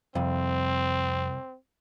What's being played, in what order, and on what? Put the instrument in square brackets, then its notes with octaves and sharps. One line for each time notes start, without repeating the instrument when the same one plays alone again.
[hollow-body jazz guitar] C2 [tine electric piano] F2 [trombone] C4